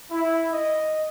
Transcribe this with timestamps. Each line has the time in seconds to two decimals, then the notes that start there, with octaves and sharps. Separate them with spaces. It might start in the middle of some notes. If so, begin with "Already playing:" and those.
0.11 E4
0.53 D#5